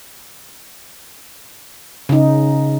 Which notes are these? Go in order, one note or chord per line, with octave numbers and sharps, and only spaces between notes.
C#3 D#4